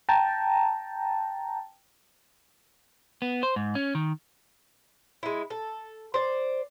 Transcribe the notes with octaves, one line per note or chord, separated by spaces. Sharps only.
G5 A5 A#5
B3
C5
G#2
C#4
D#3
G#3 E4
A4
C5 D5